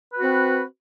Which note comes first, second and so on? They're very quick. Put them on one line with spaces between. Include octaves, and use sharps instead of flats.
B4 F#4 C4